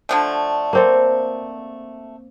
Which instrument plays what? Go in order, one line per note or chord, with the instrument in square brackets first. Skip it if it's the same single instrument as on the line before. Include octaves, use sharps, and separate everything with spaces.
[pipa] D3 F3 A3
[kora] A#3 C4 A4